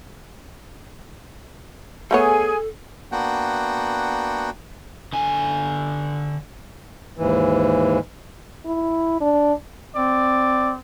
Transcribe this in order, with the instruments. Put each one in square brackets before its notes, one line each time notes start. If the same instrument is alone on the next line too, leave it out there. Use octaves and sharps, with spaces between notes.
[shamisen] A3 B3 C#5 [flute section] G#4 G#5 [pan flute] A4
[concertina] A#3 B3 D4 F#4 F#5 G5
[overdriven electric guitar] D3 G#5
[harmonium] D#2 G#2 E3
[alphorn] E4
D4
[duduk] C4 [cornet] D5